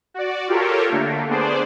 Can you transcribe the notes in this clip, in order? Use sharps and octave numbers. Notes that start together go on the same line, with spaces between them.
F#4 D5
F4 G4 A4 A#4 C#5
D3 A3 A#3
B3 D4 G#4 C5 D5